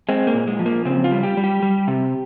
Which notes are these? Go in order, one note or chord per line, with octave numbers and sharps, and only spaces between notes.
G#3 C4
A#3
A#2
G#3
F3
A#3
C#3 C4
F4
G3
G4
G3
G4
G3
C3